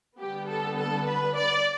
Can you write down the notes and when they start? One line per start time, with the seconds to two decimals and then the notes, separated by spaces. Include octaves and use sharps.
0.19 D3 G3 B3 G4
0.48 A4
0.77 A4
1.06 B4
1.36 D5